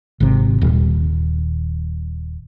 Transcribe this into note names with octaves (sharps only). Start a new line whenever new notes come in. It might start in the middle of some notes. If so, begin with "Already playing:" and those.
G#1 C3
D#1